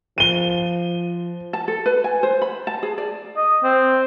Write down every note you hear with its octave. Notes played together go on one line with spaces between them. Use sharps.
F3 D#7 G7
A5
A4
B4
G#5
C5
B5
A5
G#4
D5
D#5
C4